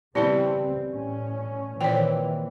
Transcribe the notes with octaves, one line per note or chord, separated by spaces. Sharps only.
C#3 E3 G3 B3 C4 E4 A5
A2 C#4
A#2 D#3 E3 C4 C#5 G5